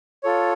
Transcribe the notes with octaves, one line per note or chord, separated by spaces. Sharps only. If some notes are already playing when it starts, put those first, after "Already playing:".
F4 A4 C#5